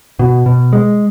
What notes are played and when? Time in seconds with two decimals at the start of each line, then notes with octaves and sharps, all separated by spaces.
0.19 B2
0.46 B2
0.73 G#3